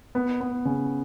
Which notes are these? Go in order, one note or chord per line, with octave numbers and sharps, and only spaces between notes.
B3
B3
C#3